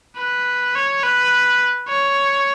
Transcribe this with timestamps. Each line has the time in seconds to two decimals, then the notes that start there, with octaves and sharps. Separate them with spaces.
0.17 B4
0.75 C#5
1.04 B4
1.89 C#5